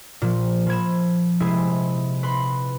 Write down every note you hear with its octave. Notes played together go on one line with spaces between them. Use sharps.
A#2 F3
F3 B5 G#6 E7
C3 G#3 E4 G#4
B4 B5 C6